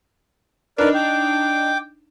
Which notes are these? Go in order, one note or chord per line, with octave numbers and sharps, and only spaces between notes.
D4 D#4 A#4 B4 D5
G5 D6